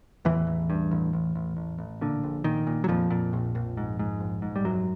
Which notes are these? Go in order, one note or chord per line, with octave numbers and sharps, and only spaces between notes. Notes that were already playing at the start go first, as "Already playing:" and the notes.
A1 E2 E3
A1
G2
A1
A1
A1
A1
A1
A#2 D3
A#1
A#2 D#3
A#2
F#3
F2 A#2 F3
A#2
A#1
A#1
G#2
G#2
A#1
G#2
G3
A#1 F#2 F#3